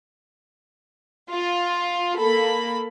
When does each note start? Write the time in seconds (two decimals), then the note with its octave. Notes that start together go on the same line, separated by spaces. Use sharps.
1.31 F4
2.18 A#3 A4 B5